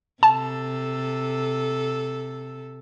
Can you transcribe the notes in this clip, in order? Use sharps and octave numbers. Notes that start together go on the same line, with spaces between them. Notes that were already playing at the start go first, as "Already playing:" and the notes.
C3 A4 A5